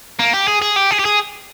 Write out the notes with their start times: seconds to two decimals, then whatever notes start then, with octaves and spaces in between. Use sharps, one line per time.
0.19 A#3
0.34 G4
0.48 G#4
0.62 G#4
0.76 G4
0.91 G#4
0.99 G4
1.05 G#4